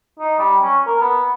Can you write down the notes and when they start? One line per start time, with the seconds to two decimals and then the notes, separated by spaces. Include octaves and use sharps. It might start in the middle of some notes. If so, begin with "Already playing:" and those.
0.20 D#4
0.38 G3
0.62 C#4
0.87 A#4
1.01 B3